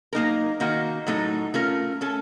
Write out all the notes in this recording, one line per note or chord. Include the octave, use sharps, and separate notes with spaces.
F#3 A#3 D#4 A#4
D#3 A#3 D#4 F#4
A2 F#3 A3 D#4
A3 C#4 F4 A#4
A3 C#4 A4